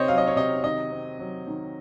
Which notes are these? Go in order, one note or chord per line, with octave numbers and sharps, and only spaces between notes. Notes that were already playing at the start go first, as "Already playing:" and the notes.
Already playing: C3 C4 C5 C#5 D#5
F#3 F5
D#5
C#5
C3 D#5
D#3 D#5
C4
F#3
D#3